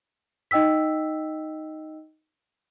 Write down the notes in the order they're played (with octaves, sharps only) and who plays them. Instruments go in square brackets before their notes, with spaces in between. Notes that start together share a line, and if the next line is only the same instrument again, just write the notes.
[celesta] D#4 D#5 G5 E6 B6